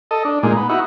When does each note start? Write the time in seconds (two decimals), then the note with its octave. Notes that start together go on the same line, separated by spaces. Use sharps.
0.11 A4 D#5
0.25 D4
0.43 A#2 G#3 D#4
0.57 B3
0.69 D#4 E4 F#4